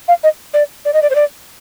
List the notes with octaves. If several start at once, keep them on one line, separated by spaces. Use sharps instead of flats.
F5
D#5
D5
D5
D#5
D5
C5
D5